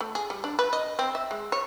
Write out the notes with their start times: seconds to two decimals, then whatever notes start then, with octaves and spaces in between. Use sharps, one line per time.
0.01 A3
0.15 G#4
0.30 G3
0.44 D4
0.59 B4
0.73 D#5
0.99 C4
1.15 E5
1.31 G#3
1.52 C#5